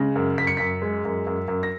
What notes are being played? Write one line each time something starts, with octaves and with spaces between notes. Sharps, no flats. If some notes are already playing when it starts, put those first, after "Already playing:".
Already playing: C#3 G#3 A#6
F#2
F#2 B6
C#7
F#2 B6
G#3
F#2
F#2
F#2
A#6